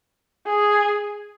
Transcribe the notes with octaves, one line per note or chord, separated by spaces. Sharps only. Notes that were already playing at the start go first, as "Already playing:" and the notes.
G#4